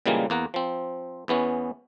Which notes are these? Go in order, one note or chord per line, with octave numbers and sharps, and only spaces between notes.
A#2 C#3 E3 G3 G#3 A#3
E2 A#3 F#5 A#5
F3 C4
E2 E3 B3 C#4